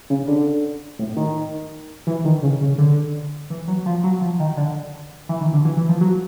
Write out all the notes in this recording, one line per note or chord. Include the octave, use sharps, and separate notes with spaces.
C#3
D3
A2
D#3
E3
D#3
C#3
C#3
D3
E3
F#3
F3
F#3
F3
D#3
D3
E3
D#3
D3
E3
E3
F3
F#3